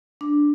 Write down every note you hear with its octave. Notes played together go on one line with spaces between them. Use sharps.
D4